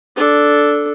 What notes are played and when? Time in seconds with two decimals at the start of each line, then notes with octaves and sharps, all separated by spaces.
0.16 D4 A4